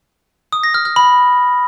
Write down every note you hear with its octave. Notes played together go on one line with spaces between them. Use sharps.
D#6
A#6
F6
F6
B5